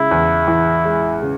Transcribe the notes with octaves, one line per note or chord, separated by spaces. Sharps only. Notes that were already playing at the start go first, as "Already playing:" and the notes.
Already playing: C#3 G#3 E4
E2
E3
G#3
C#3